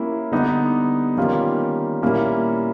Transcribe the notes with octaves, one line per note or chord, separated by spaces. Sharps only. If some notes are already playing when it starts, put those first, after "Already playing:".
Already playing: A#3 C#4 E4 G4
D3 G3 B3 D#4 G4
D#3 G3 A#3 C#4 F4
A#2 G3 A#3 C#4 E4